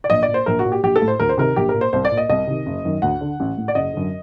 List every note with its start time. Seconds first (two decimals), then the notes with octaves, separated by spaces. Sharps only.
0.04 D5
0.10 A#1 D#5
0.23 D5
0.28 A#2
0.34 C5
0.46 A#1 A#4
0.59 F#4
0.65 A#2
0.72 G4
0.83 A#1 G4
0.96 A4
1.02 A2
1.08 C5
1.20 D2 A#4
1.29 C5
1.38 C3 D#3 A#4
1.56 A#1 G4
1.69 A#4
1.74 A#2
1.81 C5
1.93 C2 C5
2.05 D5
2.12 A#2
2.17 D#5
2.30 C2 D#5
2.47 C3 D#3
2.66 F#1
2.85 F#2 D#3
3.02 D2 F#5
3.21 D3
3.40 A1
3.57 A2
3.68 D5
3.75 F#1 D#5
3.93 F#2 D3